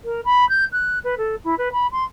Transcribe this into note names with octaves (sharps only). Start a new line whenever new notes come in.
A#4
B5
G6
F#6
B4
A4
E4
B4
B5
C6